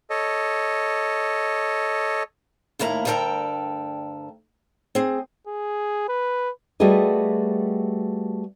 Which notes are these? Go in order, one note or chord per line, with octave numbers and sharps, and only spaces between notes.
A4 C#5 D#5
D#2 A2 A#3 E4 A#5
D2 G2 A4 A#4 G5 A#5
C4 G#4
G#4
B4
G3 A3 B3 F#4 G#4 D#5